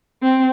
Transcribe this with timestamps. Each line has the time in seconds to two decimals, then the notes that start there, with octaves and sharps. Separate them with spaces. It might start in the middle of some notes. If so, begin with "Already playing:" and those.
0.23 C4